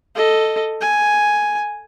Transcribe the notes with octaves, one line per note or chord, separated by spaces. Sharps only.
A4 D#5
G#5